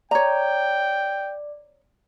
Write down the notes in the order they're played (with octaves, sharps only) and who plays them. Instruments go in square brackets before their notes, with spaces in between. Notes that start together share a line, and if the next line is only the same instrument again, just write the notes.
[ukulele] C#5 A#5 [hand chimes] D5 [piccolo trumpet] G5